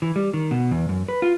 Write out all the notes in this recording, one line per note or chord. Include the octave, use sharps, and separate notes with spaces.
E3
G3
D#3
B2
E2
F#2
B4
F4